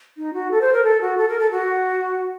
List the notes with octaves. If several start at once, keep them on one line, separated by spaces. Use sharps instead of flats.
D#4
F#4
A4
C5
A#4
A4
F#4
A4
A#4
A4
F#4